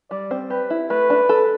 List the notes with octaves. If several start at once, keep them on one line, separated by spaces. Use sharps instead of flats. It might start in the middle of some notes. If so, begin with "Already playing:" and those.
G3 D5
C4
G4 B4
E4
A3 B4
D4
A4